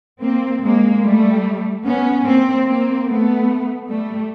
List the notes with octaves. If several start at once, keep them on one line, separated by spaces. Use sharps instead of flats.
A#3 C4
G#3 A#3
G3 A3
B3 C#4
A#3 C4
A#3 C4
A3 B3
G3 A3